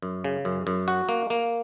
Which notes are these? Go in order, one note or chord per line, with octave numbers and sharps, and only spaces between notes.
F#2
C#3
F#2
F#2
F#4
A#3
A#3